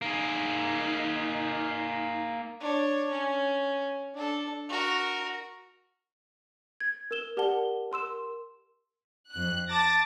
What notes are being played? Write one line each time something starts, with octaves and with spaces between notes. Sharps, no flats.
A#3 D#4 G#4
D4 C#5
C#4
D4 A4
F#4 A#4
G#6
A#4 E6 E7 G7
G4 A#4 D5 F#5 A5 G7
A#4 C6 E6 E7
F2 F#6
A5 D6 A6 A#6